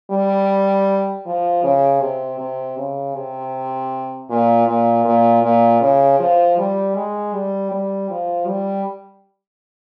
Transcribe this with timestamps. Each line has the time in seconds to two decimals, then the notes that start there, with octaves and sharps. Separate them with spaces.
0.11 G3
1.26 F3
1.63 C#3
2.01 C3
2.39 C3
2.78 C#3
3.15 C3
4.30 A#2
4.67 A#2
5.05 A#2
5.43 A#2
5.81 C#3
6.19 F3
6.58 G3
6.96 G#3
7.33 G3
7.72 G3
8.10 F3
8.48 G3